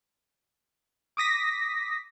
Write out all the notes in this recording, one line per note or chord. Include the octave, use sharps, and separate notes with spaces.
D6 D#6 A#6 B6